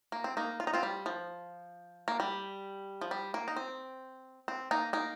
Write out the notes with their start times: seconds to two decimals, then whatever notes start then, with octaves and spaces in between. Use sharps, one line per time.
0.12 A#3
0.24 C4
0.37 A#3 D#4
0.60 F4
0.67 D#4
0.73 C4 F4
0.83 G3
1.06 F3
2.08 A#3
2.20 G3
3.01 F3
3.11 G3
3.34 A#3
3.48 D#4
3.56 C4
4.48 C4
4.71 A#3 D#4
4.93 A#3 D#4